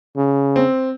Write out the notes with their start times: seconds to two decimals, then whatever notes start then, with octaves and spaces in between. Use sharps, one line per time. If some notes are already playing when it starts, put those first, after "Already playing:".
0.16 C#3
0.56 C4